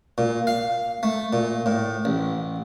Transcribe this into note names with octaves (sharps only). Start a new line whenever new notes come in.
A#2
F5
A3
A#2
A2
A1